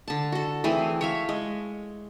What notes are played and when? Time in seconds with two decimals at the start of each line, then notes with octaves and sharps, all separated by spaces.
0.08 D3 A5
0.32 F#4 A4
0.64 E3 A3 C4 G#4
1.01 C#5 E5 F5
1.29 G#3